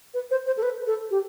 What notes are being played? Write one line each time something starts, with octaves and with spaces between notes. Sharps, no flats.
B4
C5
C5
A4
B4
A4
G4